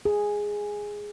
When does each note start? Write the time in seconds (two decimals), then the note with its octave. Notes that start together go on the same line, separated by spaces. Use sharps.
0.05 G#4